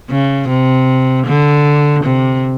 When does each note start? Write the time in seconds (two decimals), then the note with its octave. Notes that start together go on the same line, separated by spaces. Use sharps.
0.10 C#3
0.49 C3
1.26 D3
2.04 C3